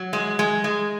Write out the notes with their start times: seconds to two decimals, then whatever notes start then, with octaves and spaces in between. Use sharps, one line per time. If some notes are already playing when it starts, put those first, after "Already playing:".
Already playing: F#3
0.13 G#3
0.39 G#3
0.64 G#3